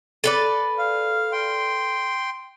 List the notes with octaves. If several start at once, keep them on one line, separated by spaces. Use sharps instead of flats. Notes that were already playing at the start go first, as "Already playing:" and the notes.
A4 B4 D5
F5
G5 C6